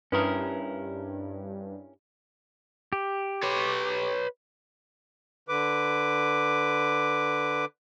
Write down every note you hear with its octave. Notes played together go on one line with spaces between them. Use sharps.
G2 C#4 E4 A#4 B4 B5 D#6
G4
B4 C#5
D3 B4 D6